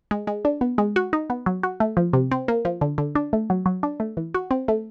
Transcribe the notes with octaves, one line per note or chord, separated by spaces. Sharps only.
G#3
G#3
D4
B3
G#3
F#4
D#4
B3
F#3
F#4
A3
F3
C3
C4
A#3
F3
D3
D3
D4
A3
F#3
F#3
D4
A3
E3
F#4
C4
A3